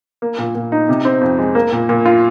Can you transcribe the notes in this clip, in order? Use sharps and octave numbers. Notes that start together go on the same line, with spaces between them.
A#3
A#2
A#2
D#4
C3
C4
F2
G#3
A#3
A#2
A#2
F4